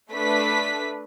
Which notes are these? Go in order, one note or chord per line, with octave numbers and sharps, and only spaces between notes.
A3 D4 B4 B6